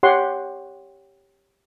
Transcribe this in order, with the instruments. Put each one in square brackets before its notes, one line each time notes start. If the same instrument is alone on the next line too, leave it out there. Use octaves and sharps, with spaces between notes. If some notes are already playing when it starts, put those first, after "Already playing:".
[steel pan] G4 C#5 F#5 C6